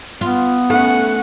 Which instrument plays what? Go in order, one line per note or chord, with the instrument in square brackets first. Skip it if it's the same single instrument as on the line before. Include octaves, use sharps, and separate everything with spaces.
[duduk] B3 [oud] F4
[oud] A3 [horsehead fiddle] C#4 F#5